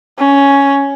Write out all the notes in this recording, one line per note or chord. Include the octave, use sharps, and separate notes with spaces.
C#4